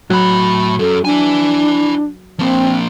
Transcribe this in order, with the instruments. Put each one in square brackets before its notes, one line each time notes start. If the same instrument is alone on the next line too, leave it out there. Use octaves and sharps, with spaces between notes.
[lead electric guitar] A2 B5 [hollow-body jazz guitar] F#3
[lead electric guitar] F#2 [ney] A4
[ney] D4 [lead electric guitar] E4 G#5
[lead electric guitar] F3 A#3 [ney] C4